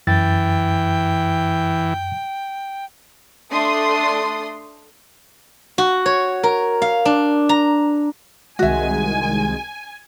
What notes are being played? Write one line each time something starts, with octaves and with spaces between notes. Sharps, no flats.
F#2 E3 G5 A6
A3 D4 C6 D#6
F#4
C#5
A#4
F5
D4
A#5
C2 D#3 G#3 F#4 E5 G#5